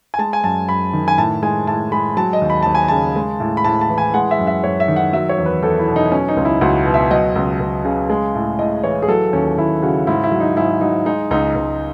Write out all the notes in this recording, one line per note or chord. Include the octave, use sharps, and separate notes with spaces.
G#5
G#3 A5
G#5
F#2 A5
F#2 B5
D#3
G#5
A2 A5
G#3 G#5
A2 A5
G#3 B5
F#3 A5
D#5
D#2
B5
D#2 A5
G#5
C#3 A5
G#3
A2
B5
A2 A5
A5
E3
G#5
G#3 F#5
E5
F#2
E5
F#2 C#5
E5
D#3
F#5
F#3 E5
C#5
E2
B4
E2 A4
E4
B2
D#4
F#3 C#4
D#4
C#2
E4
C#2 F#4
B2
E5
F#3 D#5
C#2
C#2
C#3
G#3
A2
A2 D#5
E3 C#5
G#4
F#3 A4
D#2 C#4
D#2 E4
C#3 F#4
G#2 E4
E4
F#3
D#4
G#2 E4
F#3 D#4
G#3 D#4
C#2 D#4
C#2